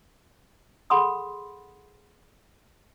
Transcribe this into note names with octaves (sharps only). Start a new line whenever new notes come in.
G#4 A4 F#5 B5 C6 D#6